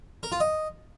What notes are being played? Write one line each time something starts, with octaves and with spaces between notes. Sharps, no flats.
A#4
F4
D#5